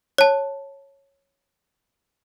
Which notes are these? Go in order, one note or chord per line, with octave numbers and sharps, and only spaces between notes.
C#5 A5